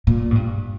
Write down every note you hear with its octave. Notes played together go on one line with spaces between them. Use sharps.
A#2
G#2
G2